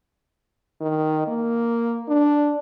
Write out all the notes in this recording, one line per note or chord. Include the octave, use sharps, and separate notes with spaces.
D#3
A#3
D4